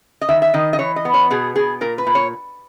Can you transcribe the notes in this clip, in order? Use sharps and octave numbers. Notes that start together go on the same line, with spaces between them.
D#5
D#3 E5
E5
D#3 D#5
D#5
E3 C#5
D#5
B3
C#5
B2 G#4
B2 G#4
A#2 A#4
B4
A#2
C#5